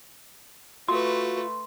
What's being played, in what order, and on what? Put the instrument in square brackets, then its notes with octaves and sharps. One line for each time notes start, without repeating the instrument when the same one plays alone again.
[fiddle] A3 B4 [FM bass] F4 [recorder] F#4 [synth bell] C6